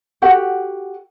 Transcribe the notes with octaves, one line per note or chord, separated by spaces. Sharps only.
F#4 G4 A4 F#5